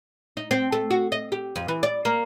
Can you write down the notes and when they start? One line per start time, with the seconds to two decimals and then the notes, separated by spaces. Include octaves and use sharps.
0.37 D#4
0.51 C4
0.72 A3
0.91 F#4
1.12 D#5
1.32 G4
1.56 F2
1.68 E3
1.83 D5
2.05 A#3